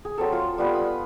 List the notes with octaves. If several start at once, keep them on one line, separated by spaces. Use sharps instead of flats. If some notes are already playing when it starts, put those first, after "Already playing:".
G#4
F#3 C4 A4
F4
G3 B3 F4 B4
G#5 B5 D#6